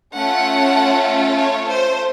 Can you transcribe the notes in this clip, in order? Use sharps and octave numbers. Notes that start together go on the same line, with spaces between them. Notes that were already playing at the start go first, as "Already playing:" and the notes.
A3 C#4 F4 A4 F#5
C#5
C5